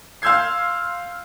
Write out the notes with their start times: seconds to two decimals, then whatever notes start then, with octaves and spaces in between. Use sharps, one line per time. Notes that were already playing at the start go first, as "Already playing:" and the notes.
0.22 F5 C6 E6 G6 G#6 C7